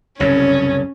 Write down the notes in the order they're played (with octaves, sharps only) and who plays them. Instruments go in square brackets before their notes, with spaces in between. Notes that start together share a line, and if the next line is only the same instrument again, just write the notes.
[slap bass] F#1 C2 G2 [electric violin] C#4 [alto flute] C#5